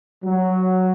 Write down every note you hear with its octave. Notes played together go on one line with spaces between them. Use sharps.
F#3